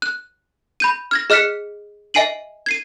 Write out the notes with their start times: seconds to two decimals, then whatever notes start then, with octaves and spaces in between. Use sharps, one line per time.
0.02 F#6
0.80 B5 G6 D#7
1.11 F6 G#6 A#6
1.30 G#4 D#5 F6 F#6 B6 C#7
2.14 D#5 E5 G#5 C7 D#7 F#7
2.66 G#6 C7 D#7